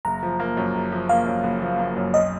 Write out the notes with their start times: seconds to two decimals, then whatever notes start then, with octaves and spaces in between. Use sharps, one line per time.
0.05 F#1 A#5
0.23 F3
0.40 A#3
0.57 F#2
0.74 F#1
0.92 F3
1.09 A#3 F5
1.26 F#2
1.44 F#1
1.61 F3
1.79 A#3
1.97 F#2
2.14 B1 D#5